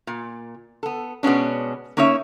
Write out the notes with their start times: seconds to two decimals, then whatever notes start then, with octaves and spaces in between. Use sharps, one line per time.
0.07 A#2
0.83 B3 A4
1.23 B2 G#3 B3 C#4 D4
1.97 A#3 C#4 D#4 C#5 E5